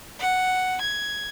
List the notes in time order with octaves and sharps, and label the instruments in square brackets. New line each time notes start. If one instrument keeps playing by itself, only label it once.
[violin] F#5
G#6